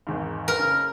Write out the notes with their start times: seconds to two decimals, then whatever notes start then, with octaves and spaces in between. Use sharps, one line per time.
0.07 G#1 E2 G#2
0.48 A#4 B4
0.59 F#1 C#3 F6